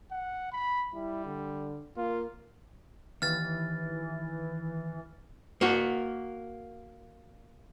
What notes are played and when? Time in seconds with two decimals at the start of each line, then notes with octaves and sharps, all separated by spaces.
0.12 F#5
0.52 B5
0.94 G3 E4
1.25 D3
1.97 A#3 F4
3.22 D#2 E3 F6 A6
5.61 A#3 F#4